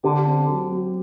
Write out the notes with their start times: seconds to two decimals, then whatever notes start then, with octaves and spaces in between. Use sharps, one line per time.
0.04 D3 G4
0.26 C4
0.49 F#3
0.72 F#3